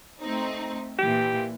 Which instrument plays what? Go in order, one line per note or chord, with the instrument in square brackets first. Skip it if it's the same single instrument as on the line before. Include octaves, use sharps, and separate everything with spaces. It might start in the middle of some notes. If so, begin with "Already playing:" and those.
[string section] A3 C4 D#4
[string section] A#2 E3 [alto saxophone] G4